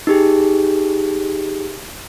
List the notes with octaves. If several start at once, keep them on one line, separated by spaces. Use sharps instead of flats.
D#4 G4 G#4